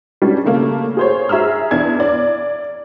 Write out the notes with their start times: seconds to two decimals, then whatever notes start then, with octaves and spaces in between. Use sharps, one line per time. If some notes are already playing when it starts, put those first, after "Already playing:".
0.22 G3 C#4 D4
0.45 C#3 A3 A#3
0.97 G#4 C5 C#5
1.29 G#4 E5 A#5 E6 F6
1.71 E2 D4 G#6
2.00 D5